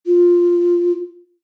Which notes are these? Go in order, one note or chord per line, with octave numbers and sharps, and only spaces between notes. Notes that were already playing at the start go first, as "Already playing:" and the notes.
F4